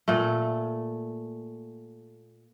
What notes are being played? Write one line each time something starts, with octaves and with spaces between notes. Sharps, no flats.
A#2 A3